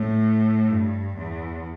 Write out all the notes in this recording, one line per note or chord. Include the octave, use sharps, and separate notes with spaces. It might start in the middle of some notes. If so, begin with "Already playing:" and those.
Already playing: A2
G2
E2